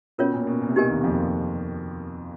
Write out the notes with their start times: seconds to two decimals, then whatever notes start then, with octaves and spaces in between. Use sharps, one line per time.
0.18 B2 C#4 F4 A#4 C#5
0.33 A#2
0.47 B2
0.61 A#2
0.69 C3
0.76 B2 D#4 G4 A#4 D#5 G#5
0.90 D#2 D#3
1.04 F2 F3